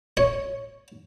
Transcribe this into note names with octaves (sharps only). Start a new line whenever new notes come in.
C#5